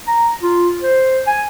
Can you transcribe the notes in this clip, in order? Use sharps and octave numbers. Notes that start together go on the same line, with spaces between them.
A#5
F4
C5
G#5